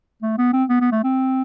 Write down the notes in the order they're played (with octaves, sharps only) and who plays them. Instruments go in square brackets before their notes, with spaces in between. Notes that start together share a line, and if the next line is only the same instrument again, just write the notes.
[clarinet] A3
B3
C4
B3
B3
A3
C4